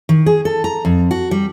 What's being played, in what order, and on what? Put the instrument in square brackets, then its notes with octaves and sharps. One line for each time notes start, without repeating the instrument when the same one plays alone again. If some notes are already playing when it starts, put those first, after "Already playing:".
[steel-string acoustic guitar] D#3
G#4
A4
A#5
F2
F#4
G3